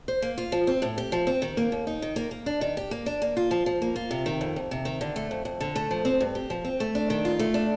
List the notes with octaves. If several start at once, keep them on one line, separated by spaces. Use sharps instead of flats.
C5
A#3
F4
F3
C4
A2
G4
F3
C4
D#3
A#3
D#2
D#4
D#3
A#3
A#3
D4
D#3
G4
A#3
D4
A#3
F4
F3
F3
A#3
F4
C3
D#3
F2
F2
C3
D#3
D3
A3
F2
F2
D3
A3
F3
C4
G2
G4
F3
C4
A3
D4
D#3
F4
A3
D4